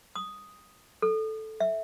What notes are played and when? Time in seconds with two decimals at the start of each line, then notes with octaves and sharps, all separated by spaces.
0.16 D#6
1.02 A4
1.60 E5